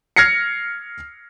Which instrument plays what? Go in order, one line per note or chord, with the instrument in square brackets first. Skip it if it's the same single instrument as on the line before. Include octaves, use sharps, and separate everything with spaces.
[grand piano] F6 G#6 A#6 C7 C#7